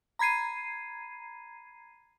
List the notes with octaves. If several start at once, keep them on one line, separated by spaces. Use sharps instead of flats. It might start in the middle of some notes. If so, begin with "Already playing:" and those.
A#5 B5 G#6 C7 D#7